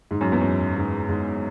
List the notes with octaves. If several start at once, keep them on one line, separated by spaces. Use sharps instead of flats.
G#2
F#2
E2
F#2
G#2
G#2